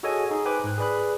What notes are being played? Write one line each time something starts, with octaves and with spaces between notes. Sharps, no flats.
F#4 G#4 A4 C#5 D#5 G#5
D#4 G#4
B4 C5 G5 G#5 D6 F#6
G#2 F#6
G#4 B4 D5 B5 F#6